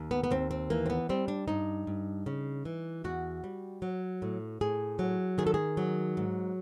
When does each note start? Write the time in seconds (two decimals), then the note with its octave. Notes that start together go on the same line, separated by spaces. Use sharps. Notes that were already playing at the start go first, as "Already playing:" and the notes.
Already playing: D#2
0.11 B3
0.24 B3
0.31 D#2 C4
0.51 C4
0.70 E3 A#3
0.86 C4
0.90 B3
1.09 G3 C4
1.28 D4
1.48 G2 D#4
1.87 G2
2.26 C#3
2.65 E3
3.04 E2 F#4
3.44 G3
3.82 F#3
4.22 A2
4.61 A2 G#4
4.99 F#3
5.38 D#3 G#4
5.47 A4
5.54 G#4
5.77 F#3
6.17 G#2